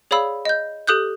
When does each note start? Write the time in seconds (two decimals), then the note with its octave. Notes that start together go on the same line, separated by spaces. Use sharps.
0.11 G#4 C#5 D5 F5 B5 E6
0.45 D#5 G6
0.87 G4 A4 D#6 F#6 G6